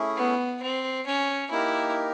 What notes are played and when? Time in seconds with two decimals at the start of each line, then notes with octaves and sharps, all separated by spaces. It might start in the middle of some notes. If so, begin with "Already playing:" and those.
Already playing: A3 C#4 E4 G#4
0.16 B3
0.62 C4
1.06 C#4
1.51 A#3 D#4 E4 G4 A#4